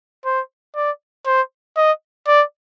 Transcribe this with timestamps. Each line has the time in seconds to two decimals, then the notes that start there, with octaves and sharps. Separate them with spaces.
0.25 C5
0.75 D5
1.26 C5
1.77 D#5
2.27 D5